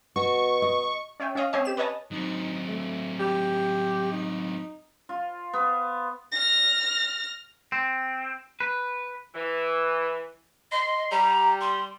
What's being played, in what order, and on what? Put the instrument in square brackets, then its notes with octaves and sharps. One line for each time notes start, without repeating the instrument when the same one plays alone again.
[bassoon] B2 [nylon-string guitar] F#4 [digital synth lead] C#6
[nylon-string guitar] D#5
[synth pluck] C#4 C#5 E5 G5
C#4 C#5 D#5 F5
C4 C#4 C5 C#5 D#5 G#5
G4 E7
B4 C#5 D#5 G#5 A5
[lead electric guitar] F#3 C4 [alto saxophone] D#4
[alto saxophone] A3
G4
D#4
[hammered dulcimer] F4
B3
[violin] F6 A#6
[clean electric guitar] C4
B4
[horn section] E3
[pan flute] D#5 [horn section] C6
[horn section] G3 [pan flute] A#5
[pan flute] C6